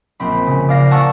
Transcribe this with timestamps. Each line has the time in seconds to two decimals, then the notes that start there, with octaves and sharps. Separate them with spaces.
0.20 A#1 C4 B5
0.46 C#3
0.69 D5 F5 A#6
0.90 F#5 G5 A5 A#5 C#6 E6